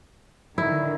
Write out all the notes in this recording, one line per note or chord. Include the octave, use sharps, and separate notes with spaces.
D3 D#3 E4